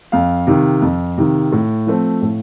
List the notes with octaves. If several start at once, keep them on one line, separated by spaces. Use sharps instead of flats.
F2 F5
C3 D#3
F2
C3 D#3
A2
F3 A3 C4
A2